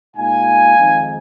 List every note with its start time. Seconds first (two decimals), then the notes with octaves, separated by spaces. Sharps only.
0.17 A#2 G#3 D#4 F5 G#5
0.77 F2 D#3 G#3 C4 D#4